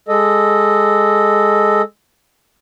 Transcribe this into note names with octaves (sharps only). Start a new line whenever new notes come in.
G#3 A4 D#5